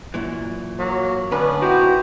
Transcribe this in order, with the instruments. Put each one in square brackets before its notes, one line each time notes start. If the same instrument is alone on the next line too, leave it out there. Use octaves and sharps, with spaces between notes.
[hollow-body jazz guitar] F#2 A#2 E3
[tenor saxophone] F#3 [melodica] A#3
[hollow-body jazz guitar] D2 B4 [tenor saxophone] B3 [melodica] C#4 D4
[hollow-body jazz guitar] D#4 E4 [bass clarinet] F#4 [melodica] G4 C5 A#5